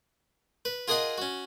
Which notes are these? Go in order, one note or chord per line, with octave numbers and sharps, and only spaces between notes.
B4
F4 G#4 A#4 D#5 F#5 G#5
C#4 F#4